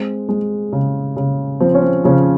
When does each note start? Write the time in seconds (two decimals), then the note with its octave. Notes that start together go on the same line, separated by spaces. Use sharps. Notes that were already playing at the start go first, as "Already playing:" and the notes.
Already playing: G#3 C4
0.29 G#3
0.73 C#3
1.17 C#3
1.60 F3 C4
1.74 C#4
1.82 C4
2.04 C#3 F3 C#4